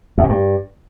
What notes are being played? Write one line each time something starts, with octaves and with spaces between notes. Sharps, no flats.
E2
A#2
G2